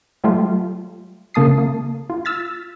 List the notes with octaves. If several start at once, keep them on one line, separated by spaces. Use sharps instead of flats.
F#3 G3 A3 F4
C#3 A#3 A5 D#6 C7
A#3
F4
E6 F6 A6 B6